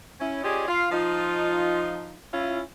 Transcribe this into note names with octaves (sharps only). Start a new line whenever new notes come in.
C#4 E4
C#4 F4 G4 G#4 D5 D#5
F4 F5
F3 D#4 F4
C#4 E4 F4